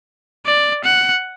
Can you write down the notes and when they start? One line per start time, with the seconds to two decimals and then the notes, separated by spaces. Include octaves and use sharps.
0.46 D5
0.84 F#5